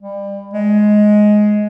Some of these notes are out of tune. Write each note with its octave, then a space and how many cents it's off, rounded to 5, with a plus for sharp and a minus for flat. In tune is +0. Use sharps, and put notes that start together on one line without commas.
G3 +30
G#3 +10